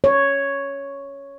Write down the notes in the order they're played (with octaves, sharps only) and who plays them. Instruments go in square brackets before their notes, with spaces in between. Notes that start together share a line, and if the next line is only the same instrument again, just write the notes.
[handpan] C#5